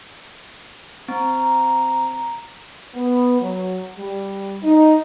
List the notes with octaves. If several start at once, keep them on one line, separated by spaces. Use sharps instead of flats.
C4 A#5
B3
F#3
G3
D#4